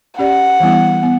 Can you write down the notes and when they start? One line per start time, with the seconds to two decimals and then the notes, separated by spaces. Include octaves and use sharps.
0.19 C#4 G4 D5 F#5
0.60 E3 G3 B3 E4
1.03 B3